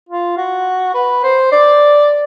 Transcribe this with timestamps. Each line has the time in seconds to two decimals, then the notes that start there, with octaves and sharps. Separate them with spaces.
0.09 F4
0.37 F#4
0.94 B4
1.23 C5
1.52 D5